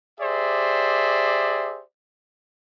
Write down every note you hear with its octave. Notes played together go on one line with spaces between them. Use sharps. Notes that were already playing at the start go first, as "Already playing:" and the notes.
G4 G#4 C5 D5 E5